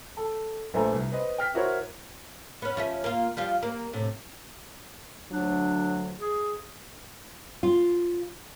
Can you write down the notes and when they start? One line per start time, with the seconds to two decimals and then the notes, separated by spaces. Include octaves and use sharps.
0.17 A4
0.74 A#1 A3 B4 C5 G#5 A#5
0.92 C2
1.11 B3 B4 C5 D#5
1.38 G5 F6 B6
1.54 E4 F#4 A#4 C5 C#5
2.62 B3 C#4
2.77 F3 C#4 E5
3.04 A#3 F4
3.37 F3 G3 F4
3.63 A#3
3.93 A2 C3
5.31 D2 F#3 D4
6.20 G#4
7.63 F4